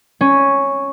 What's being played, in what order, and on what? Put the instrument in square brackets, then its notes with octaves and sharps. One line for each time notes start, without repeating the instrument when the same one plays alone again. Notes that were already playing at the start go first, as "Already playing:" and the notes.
[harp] C#4